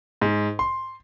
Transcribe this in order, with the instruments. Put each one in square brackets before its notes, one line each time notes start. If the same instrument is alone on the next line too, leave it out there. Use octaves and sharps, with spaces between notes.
[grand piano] G#2
C6